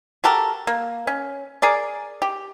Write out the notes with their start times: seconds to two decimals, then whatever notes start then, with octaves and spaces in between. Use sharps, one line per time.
0.24 F#4 G4 A4 A#4
0.67 A#3
1.07 C#4
1.62 G#4 A#4 D5
2.22 G4